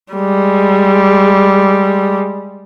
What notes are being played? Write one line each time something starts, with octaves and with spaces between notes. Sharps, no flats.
G3 G#3